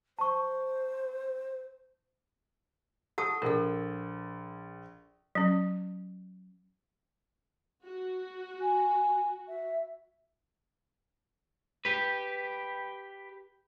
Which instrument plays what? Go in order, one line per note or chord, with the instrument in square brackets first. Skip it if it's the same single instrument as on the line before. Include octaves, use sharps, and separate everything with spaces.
[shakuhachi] C5 [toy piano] A5 C#6
[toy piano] G4 F#5 A5 [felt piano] A4 D#6
[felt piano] A#1 [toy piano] A4 A#4
[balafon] F#3 C#4
[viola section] F#4
[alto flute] G#5
E5
[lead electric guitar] G4 B4